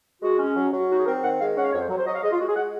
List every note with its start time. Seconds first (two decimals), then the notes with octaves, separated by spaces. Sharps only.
0.22 G#3 F#4
0.39 C#4
0.56 F#3
0.72 F#3
0.89 D#4 F#4
0.98 G#4
1.06 C4 A#4
1.23 D#3 F#5
1.39 G#3 F5
1.56 C#4 F#5
1.64 F5
1.73 F2 C#5
1.81 C5
1.90 F#3
1.98 C5
2.06 F#3 D#5
2.15 F5
2.23 G#3 D#5
2.31 F4
2.39 G#3 F#4
2.48 G#4
2.56 G#3 F#5